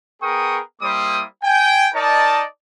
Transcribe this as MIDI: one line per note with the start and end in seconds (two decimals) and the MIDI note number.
0.22 0.59 59
0.22 0.59 68
0.22 0.59 70
0.22 0.59 79
0.22 0.59 85
0.22 0.59 87
0.82 1.23 55
0.82 1.23 58
0.82 1.23 64
0.82 1.23 72
0.82 1.23 86
0.82 1.23 87
1.44 1.88 79
1.44 1.88 80
1.95 2.43 63
1.95 2.43 70
1.95 2.43 74
1.95 2.43 75
1.95 2.43 81